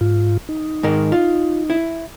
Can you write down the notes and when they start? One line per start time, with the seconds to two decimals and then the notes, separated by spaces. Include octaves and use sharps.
0.01 G#2 F4
0.49 D#4
0.83 G#2 D#3 A#4
1.12 F4
1.70 E4